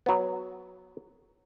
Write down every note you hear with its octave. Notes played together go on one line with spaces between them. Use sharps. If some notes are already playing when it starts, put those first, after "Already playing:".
F#3 B3